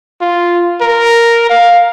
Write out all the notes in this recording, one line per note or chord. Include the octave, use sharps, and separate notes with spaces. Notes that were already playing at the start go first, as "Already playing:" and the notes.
F4
A#4
F5